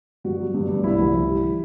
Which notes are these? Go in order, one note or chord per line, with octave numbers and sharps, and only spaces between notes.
G2 F#4
F#3
G2
G2
C2 E4
C2
C2
G3
E3